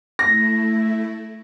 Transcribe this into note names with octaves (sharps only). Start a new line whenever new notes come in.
A3 E4 A#6